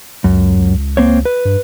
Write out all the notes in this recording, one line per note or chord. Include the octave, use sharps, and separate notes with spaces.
C#2 F#2
C#2
A#3 C4 C#5
B4
G2